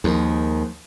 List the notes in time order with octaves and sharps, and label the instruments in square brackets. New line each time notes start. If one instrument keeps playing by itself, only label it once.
[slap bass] D#2 [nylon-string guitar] F3 G#3 A#3